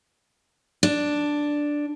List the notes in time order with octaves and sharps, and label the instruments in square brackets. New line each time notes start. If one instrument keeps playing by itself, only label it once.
[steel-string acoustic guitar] D4